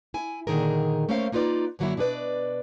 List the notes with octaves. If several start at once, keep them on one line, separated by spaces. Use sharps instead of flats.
E4 G#5
A#2 D3 D#3 G#4 A#4
A3 A#3 C#4 A#4 C5 F5
A#3 D#4 F4 B4 D5
F#2 D3 F#3 A#3 E4
B2 D4 G#4 B4 D5